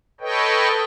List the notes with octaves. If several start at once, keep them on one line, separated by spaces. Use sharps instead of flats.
A4 B4 C#5 D#5 G5